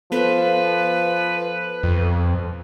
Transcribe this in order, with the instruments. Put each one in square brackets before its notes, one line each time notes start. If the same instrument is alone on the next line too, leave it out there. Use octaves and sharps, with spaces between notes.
[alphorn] F3 [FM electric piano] B3 A4 [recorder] B4
[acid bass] F2